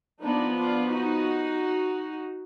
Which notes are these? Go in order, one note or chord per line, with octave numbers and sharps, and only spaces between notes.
F3 B3 D4 D#4
D4 F4
D#4 F#4